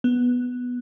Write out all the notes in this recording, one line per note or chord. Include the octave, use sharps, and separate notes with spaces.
B3